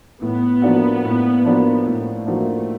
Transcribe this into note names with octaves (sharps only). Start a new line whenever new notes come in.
A2 B3
F3 A#3 D4 F#4
A2
F3 A#3 D4 F#4
A2 A3
F3 A#3 D4 F#4